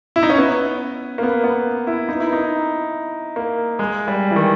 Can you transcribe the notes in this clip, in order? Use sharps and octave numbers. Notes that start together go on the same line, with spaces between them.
E4
D#4
C#4
B3
A#3
B3
B3
E4
D#4
E4
D#4
A#3
G#3
G3
E3
D#3